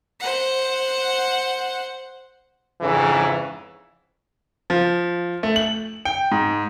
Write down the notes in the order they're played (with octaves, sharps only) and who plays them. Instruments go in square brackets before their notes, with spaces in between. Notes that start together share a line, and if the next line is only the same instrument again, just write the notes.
[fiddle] C5 F#5
[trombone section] F2 G#2 C#3 E3
[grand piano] F3
A3
F#7
G5
G#2